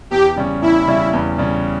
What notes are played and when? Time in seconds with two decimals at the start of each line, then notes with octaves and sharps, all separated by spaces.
0.11 E2 G4
0.36 C#3 G3 C#4
0.62 E2 E4
0.87 C#3 G3 C#4
1.13 E2
1.38 C#3 G3 C#4